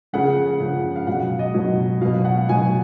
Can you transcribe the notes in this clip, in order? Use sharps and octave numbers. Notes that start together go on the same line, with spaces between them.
C#3 F3 F#5
C#3 F3
F5
B2 F#3 F#5
D#5
B2 F#3
B2 F#3 F5
F#5
B2 F#3 G#5